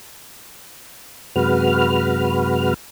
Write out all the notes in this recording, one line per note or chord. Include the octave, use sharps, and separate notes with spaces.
F#2 C3 G#3 F#4 B4 F6